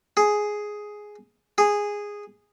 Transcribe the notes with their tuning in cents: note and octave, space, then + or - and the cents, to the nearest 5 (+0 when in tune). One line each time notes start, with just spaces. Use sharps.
G#4 +5
G#4 -10